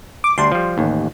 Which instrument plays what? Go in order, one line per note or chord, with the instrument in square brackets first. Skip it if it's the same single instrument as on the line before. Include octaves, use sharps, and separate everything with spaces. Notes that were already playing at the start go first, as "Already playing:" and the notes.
[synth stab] D6
[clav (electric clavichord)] D2 G3 D4 [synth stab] C6
[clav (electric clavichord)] F3 G3
A1 D#2